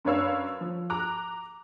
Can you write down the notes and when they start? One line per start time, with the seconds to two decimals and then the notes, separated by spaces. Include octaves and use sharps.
0.05 F#2 D4 B4 C#5 F5 E6
0.61 F3
0.90 A#5 D6 F#6